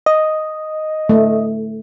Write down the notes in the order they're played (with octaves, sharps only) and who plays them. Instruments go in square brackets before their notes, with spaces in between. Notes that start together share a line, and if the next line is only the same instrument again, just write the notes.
[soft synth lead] D#5
[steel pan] A3